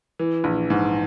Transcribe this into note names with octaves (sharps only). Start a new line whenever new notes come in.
E3
A#1
G#2